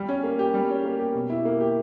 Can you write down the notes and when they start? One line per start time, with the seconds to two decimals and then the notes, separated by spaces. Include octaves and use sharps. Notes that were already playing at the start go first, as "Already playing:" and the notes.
Already playing: G3
0.09 C#4
0.23 A#3
0.39 G4
0.54 G3
0.69 C#4
0.84 A#3
0.99 G4
1.15 B2
1.30 E4
1.45 A#3
1.60 G4